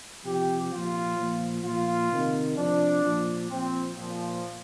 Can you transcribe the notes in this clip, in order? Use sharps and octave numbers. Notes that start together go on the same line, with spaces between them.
C3 F3 G4
A#2 F3 F4
A#2 F3
A#2 F3 F4
C3 D#3
C3 F3 D4
A#2 F3
A#2 F3 C4
A#2 F3